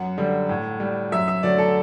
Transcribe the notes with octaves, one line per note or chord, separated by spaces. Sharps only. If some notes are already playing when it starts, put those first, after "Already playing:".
Already playing: F#2 F#5
D3 G3
A2
G3
F#2 E5
E5
D3 F#3 A3 D5
A4